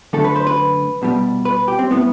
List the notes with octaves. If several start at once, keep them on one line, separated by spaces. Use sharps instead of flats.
F#2 D3 A3 A4
B4
C5
B4
C2 B2 G3
B4
G4
C4
A2 G3 B3